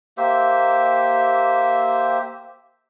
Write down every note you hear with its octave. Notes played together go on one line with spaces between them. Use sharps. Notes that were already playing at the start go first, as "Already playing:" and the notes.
A#3 G4 C5 E5